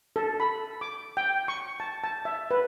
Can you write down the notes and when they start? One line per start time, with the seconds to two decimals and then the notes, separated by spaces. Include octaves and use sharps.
0.16 A4
0.40 B5
0.81 D6
1.17 G5
1.48 C#6
1.80 A5
2.04 A5
2.25 E5
2.51 B4